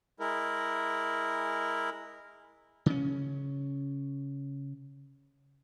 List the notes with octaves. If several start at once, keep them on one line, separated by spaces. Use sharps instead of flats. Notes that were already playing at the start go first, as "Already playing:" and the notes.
G#3 E4 A#4
C#3 C#4